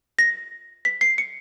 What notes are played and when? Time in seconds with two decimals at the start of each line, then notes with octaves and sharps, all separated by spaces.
0.19 A#6
0.85 B6
1.01 C7
1.18 C#7